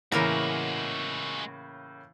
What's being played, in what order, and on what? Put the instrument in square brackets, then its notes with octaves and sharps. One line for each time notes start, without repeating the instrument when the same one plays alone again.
[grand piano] A2 C#3 A#3 [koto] E3 A#4 A#5 [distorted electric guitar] G#3 F#4